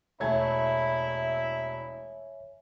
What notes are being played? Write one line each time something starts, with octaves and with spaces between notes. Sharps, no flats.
E1 A3 E4 C#5 E5 G#5 G#6